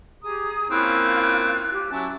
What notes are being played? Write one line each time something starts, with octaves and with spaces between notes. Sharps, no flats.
G4 G#4 A#5 D#6
A#3 C4 C#4 E4 F4 F#6
G4
F#3 C#4 E4 A5